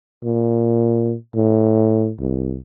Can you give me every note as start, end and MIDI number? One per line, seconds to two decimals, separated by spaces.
0.24 1.14 46
1.35 2.11 45
2.20 2.57 36